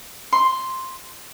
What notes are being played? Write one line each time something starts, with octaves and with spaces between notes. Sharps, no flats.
C6